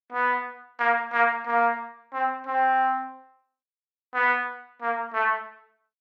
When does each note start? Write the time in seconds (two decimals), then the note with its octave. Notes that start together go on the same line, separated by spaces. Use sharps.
0.12 B3
0.79 A#3
1.13 A#3
1.47 A#3
2.13 C4
2.47 C4
4.14 B3
4.82 A#3
5.14 A3